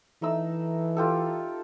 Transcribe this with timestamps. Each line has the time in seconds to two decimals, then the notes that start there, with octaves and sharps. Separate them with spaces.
0.22 E3 A3 D#4 E6
0.97 F4 G4 A4